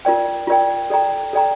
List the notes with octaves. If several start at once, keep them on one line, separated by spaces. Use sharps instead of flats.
F4 A#4 D5 G5
F4 A#4 D5 G5
A4 D5 G5 A#5
A4 D5 G5 A#5